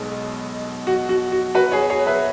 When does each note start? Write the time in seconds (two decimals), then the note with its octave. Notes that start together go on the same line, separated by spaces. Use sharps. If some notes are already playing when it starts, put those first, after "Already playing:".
Already playing: B1 B2 G#3 B3
0.87 F#4
1.09 F#4
1.32 F#4
1.55 F#4 B4
1.72 G#4 C#5
1.90 G#4 C#5
2.07 B4 E5